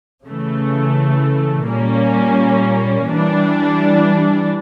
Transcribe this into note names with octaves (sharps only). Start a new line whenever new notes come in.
C#3 E3 A3
A#2 G3 A#3 C#4
E3 G3 D4